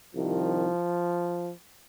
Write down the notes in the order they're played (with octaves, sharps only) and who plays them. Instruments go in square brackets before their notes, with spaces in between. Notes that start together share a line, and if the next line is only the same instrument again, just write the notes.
[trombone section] C2 C3 D#3 F3